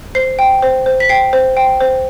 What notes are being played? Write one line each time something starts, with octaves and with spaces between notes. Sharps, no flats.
C5 C7
G5
C5
C5
B6
G5 C7
C5
G5
C5